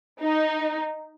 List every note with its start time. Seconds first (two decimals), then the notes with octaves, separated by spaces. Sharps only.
0.21 D#4